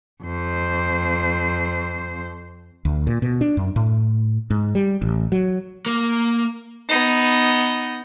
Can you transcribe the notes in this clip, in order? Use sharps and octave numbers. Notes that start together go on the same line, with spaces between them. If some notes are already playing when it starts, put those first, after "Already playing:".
F2 C5
D2
A#2
B2
D4
F#2
A2
G#2
G3
A1
F#3
A#3
B3 D#4